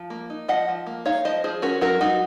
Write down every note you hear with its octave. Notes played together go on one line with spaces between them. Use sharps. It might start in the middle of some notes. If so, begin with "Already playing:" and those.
Already playing: F3
A#3
D#4
F3 D#5 F#5
F3
A#3
D#4 C#5 F5
F3 C5 D#5
F3 G#4 C5
C#4 F#4 A#4
F#3 F#4 A#4
F#3 D#4 F#4